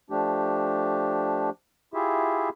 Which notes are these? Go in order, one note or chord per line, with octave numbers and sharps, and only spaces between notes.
F3 A3 D4 G4
E4 F4 G4 G#4 E5